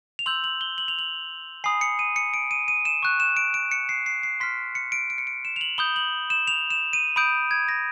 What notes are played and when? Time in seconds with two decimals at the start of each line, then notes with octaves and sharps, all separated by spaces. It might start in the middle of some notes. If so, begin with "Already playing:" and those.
0.19 F7
0.26 C6 E6 G6 F#7
0.44 F#7
0.61 G7
0.78 F#7
0.88 F7
0.99 F#7
1.64 G#5 B5 D#6 C7
1.81 C#7
1.99 D#7
2.16 C#7
2.34 D7
2.51 D#7
2.68 D#7
2.85 E7
3.03 C#6 F#6
3.20 E7
3.37 D7
3.54 D7
3.71 C#7
3.89 C7
4.06 C7
4.23 C7
4.40 C6 F6 B6
4.75 C#7
4.92 D7
5.10 D7
5.18 C#7
5.27 D7
5.45 E7
5.56 F7
5.61 F#7
5.78 B5 D#6 G6 G7
5.96 F#7
6.30 E7
6.47 F7
6.70 E7
6.93 D#7
7.16 B5 D#6 G6 D7
7.51 G#6
7.69 A#6